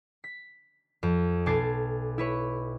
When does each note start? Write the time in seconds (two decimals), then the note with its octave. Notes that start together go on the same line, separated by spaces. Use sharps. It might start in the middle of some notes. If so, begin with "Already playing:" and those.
0.24 B6
1.03 F2
1.46 B1 A4 G#5 D6 A6 C7
2.18 E4 B4 C#5